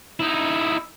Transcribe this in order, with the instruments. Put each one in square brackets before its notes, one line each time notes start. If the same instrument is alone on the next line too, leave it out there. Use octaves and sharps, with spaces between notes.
[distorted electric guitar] D#4 E4